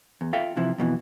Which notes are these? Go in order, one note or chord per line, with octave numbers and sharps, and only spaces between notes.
E2
F4 A4 E5 F5 G5
C3 E3 F3 E4
F2 B2 D#3 E3